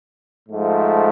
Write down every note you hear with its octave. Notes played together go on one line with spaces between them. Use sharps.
G#2 F3 A3